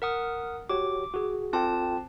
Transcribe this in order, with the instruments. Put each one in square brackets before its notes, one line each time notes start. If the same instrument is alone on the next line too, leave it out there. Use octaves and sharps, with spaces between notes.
[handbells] A#4 F#5 D#6
[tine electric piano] F#4 G4 C#5 [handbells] D6
[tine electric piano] F#4 G#4
[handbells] C4 A5 [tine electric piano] F4 A4 G5